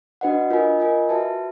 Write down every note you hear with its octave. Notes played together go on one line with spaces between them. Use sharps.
D4 F#4 B4 D#5 F#5
F4 A#4 D#5 G#5
F4 A#4 D#5 G#5
F#4 B4 E5 A5